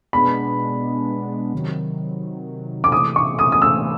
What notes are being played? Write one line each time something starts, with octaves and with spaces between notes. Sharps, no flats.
B2 G#3 B3 D4 B5
C3 D#3 F#3
D6
C3 E3 A3 D#6
C#6
D#6
D#6
E6